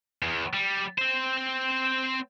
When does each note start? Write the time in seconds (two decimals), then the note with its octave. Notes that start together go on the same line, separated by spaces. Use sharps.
0.23 E2
0.54 G3
0.98 C4 C5